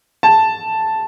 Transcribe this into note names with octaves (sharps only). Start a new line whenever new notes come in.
A5